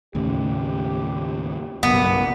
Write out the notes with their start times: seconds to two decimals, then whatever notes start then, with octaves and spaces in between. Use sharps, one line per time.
0.15 D#2 A2 C#3 G4
1.83 F#1 B1 G2 B2 A#3 B3